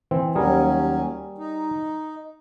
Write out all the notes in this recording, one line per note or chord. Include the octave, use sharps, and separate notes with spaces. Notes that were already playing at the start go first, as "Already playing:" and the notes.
E3 C4
D#2 F#3 G3 C#4 G#4 A#4
D#4